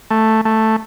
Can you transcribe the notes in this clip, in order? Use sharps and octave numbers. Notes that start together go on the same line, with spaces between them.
A3
A3